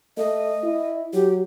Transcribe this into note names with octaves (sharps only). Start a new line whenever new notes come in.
A3 D#5
E4
F#3 G4